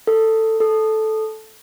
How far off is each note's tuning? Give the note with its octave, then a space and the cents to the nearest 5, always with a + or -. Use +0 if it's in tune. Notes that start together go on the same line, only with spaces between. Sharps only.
A4 +15
A4 -10